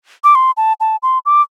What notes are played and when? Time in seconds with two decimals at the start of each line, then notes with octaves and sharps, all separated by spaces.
0.24 D6
0.35 C6
0.57 A5
0.80 A5
1.03 C6
1.26 D6